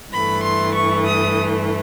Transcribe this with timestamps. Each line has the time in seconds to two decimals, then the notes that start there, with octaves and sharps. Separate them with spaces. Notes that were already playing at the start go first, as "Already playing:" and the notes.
0.12 G2 E3 A3 B5
0.44 C6
0.75 C#6
1.06 D#6